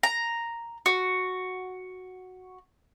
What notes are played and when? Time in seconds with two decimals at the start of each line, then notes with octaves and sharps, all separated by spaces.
0.03 A#5
0.86 F#4